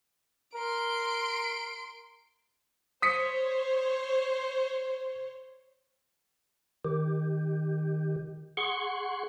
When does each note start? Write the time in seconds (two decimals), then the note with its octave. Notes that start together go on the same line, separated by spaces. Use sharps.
0.55 A#4 C6 D7
3.02 C5 C#5 D#6 B6 C#7
6.85 D#3 G4
8.57 G#4 F#5 C6 C#6